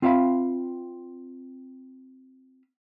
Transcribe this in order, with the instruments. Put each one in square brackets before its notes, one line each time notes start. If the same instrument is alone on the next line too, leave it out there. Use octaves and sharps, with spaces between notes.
[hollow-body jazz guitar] C4 F4 E5 F5 G5 B5